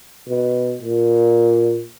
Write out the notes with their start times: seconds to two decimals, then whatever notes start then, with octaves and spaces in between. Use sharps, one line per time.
0.29 B2
0.82 A#2